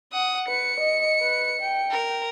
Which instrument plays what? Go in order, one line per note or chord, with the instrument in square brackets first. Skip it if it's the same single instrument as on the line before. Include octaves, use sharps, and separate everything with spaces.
[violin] F#5 D#6
[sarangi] B4 [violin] C#7
[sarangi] D#5
B4
G5
[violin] A#4